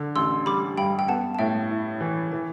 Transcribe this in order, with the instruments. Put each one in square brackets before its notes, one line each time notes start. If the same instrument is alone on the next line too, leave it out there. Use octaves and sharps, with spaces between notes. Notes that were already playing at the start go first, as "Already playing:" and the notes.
Already playing: [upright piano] D3
[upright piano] A1 [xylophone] C6 E6
[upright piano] G3 [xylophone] B5 D6
[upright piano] G2 [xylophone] G5 B5
[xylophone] G5
[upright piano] B3 [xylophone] F#5 A5
[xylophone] A5
[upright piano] A2 [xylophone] E5 G5
[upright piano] E4
E3
E3